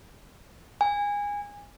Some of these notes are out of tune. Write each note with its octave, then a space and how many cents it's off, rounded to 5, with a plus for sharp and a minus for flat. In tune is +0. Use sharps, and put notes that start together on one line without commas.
G#5 -25